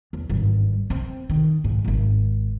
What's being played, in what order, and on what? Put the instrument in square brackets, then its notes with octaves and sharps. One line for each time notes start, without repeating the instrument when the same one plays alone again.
[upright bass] E2
G#1 G2
C4
D#3
G#2
D#1 G#1